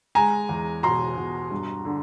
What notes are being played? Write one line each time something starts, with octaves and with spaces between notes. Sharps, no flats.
G#3 G#5 A#5
E2
B2 A#5 C6
B2
G2
D3